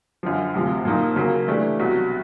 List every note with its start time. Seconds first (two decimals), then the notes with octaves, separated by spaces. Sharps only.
0.23 F#2 D3 F3
0.54 D2 C3 F3
0.85 A#2 F3 A#3 D#4
1.16 C#3 F#3 A#3
1.48 E3 A3 D4 G4
1.79 C2 B2 F#3